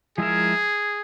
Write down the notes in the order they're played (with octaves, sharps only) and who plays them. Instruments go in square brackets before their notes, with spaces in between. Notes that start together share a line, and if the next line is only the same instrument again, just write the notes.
[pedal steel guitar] F3 G#3 E4 A#4 E5 [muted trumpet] G#4